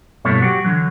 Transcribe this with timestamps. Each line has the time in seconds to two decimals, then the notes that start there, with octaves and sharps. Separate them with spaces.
0.25 G2 B2 A#3 E4 A4 C#5
0.40 F#3 F#4 G4
0.64 D3 E3 F#3